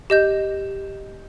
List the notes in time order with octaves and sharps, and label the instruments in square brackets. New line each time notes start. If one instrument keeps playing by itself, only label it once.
[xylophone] G4 D#5 G6